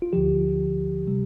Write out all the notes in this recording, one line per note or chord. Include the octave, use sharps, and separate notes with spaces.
F4
D2 D3 F3 G4
C3 G3